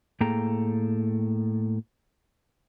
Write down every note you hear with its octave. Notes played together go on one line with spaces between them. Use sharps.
A2 A#3 G#4 A4 G5 A#5